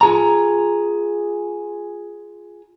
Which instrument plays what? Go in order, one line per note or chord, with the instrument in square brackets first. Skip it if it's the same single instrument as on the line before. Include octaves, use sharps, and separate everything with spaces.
[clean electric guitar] F4 G#4 A#5